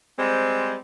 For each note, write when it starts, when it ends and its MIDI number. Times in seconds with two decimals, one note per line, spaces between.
0.19 0.75 55
0.19 0.75 56
0.19 0.75 60